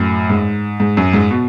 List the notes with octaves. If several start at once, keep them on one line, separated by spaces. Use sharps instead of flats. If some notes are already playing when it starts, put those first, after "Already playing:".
Already playing: F#2 A2
G#2
G#2
F#2
G#2
B2